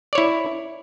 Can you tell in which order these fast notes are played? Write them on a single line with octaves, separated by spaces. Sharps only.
D5 C#5 E4